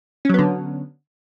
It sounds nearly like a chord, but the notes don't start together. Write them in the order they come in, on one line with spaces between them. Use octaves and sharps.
C#4 F#3 B3 D3